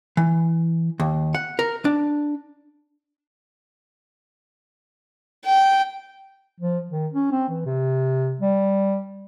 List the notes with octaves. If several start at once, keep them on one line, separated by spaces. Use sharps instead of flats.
E3
D#2
F#5
A#4
D4
G5
F3
D#3
C#4
C4
E3
C3
G3